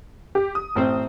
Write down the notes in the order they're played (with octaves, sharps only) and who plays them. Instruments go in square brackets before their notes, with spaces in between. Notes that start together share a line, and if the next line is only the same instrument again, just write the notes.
[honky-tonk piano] G4
D#6
[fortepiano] A1 C4 C5